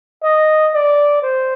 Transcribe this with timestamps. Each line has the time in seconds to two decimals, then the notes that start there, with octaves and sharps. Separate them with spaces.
0.24 D#5
0.74 D5
1.22 C5